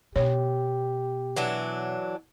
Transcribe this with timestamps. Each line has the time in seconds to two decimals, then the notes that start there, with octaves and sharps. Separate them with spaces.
0.16 B2 G4 C#5
1.36 E3 F#3 D4